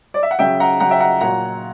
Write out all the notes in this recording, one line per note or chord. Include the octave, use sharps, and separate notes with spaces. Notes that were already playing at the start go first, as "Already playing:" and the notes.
D5
E5
F#5
C#3 F#3 E5 G5
F#5 A#5
C#3 F#3 F#5 A#5
E5 G5
F#5 A#5
A#2 F#3 F#5 A#5